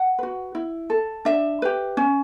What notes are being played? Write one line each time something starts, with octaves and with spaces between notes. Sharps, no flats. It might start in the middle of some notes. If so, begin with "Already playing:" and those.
Already playing: F#5
F#4 B4
E4
A4
D4 E5
G4 B4
C#4